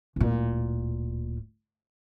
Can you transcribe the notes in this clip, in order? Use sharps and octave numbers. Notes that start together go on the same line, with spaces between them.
D1 A#2